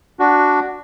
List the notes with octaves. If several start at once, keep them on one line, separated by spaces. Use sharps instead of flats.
D4 F#4